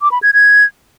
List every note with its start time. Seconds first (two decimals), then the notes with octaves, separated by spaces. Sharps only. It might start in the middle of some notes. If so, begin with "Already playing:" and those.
0.01 D6
0.12 B5
0.23 G#6
0.34 G#6